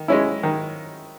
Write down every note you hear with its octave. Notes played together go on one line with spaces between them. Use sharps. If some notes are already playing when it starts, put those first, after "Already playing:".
Already playing: D#3
G#3 C#4 E4
D#3